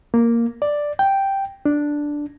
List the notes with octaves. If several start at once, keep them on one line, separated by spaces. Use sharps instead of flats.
A#3
D5
G5
D4